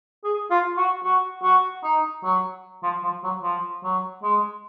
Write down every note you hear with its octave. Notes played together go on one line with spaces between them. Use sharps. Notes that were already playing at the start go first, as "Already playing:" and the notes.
G#4
F4
F#4
F#4
F#4
D#4
F#3
F3
F3
F#3
F3
F#3
G#3